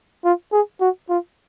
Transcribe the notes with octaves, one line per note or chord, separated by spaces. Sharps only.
F4
G#4
F#4
F4